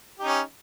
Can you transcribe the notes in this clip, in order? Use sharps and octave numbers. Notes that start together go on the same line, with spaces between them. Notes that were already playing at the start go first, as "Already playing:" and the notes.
C#4 D#4 G4